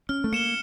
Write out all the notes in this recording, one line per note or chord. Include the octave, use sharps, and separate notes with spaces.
C#4 F6
A3
A#3 C#7 E7 G7